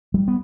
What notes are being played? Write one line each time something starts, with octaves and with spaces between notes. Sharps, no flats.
G3
B3